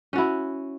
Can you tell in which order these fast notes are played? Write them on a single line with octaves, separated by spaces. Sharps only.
C#4 F#4 E4